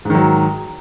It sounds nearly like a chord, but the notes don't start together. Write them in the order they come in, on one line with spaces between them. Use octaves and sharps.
G#2 D#3 F#3